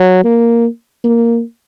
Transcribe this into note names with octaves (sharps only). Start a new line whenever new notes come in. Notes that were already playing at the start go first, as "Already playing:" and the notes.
Already playing: F#3
A#3
A#3